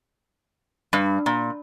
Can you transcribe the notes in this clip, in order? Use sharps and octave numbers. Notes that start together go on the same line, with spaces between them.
G2
A#2